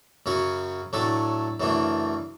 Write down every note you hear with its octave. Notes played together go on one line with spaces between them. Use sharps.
F#2 C#3 F#3 C#4 F#4
A2 F#3 A3 D4 A4
F#2 C#3 E3 A3 D4